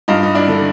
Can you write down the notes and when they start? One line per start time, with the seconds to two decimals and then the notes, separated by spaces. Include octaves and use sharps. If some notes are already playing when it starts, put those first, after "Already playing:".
0.08 G2 D#4 F4
0.23 D#4
0.35 D4 E4
0.48 D3